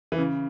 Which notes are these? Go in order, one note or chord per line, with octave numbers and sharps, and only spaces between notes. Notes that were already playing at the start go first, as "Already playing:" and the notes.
E3
C#3